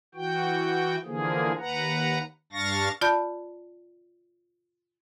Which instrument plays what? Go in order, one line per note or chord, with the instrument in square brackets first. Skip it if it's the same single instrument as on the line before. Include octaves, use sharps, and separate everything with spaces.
[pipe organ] E3 F#4 G5
D3 E3 F3 A#3 G#4
D#2 B4 F#5 A#5
G2 D4 F5 C#6 A6 A#6
[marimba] F4 D5 A5 B5 G6